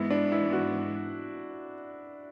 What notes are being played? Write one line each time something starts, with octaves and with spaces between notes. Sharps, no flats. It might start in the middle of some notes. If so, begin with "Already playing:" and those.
Already playing: G#2 E3 G#3 B3 E4
D4
E4
F#4